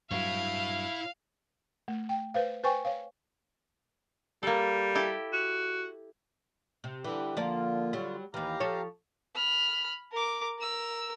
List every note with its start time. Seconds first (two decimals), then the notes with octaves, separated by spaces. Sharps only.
0.11 G2 F#3 E4 C#5 F5
1.88 A3
2.09 G5
2.34 B4 C5 F5
2.64 B4 C5 G5 G#5 C#6
2.85 C#5 F5
4.43 G3 A#3 A4
4.95 E4 G4 A4
5.33 F#4
6.84 C3
7.04 D3 E3 G3 G4
7.37 D3 F3 A#3 F4 D5
7.93 F#3 G3
8.34 D#2 E3 G4 F5 A#5
8.60 F3 A4 C#5
9.35 B5 F6
10.12 A#4 D6
10.59 A#4 E6